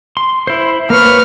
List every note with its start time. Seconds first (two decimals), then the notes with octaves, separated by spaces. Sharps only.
0.17 C6
0.47 E4 C5
0.90 A#3 B4 C#5 F6